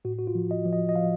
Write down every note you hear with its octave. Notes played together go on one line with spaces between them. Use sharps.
A2 F#4
F#4
F4
F3
D#5
F3
D#5
D#5
F3 F5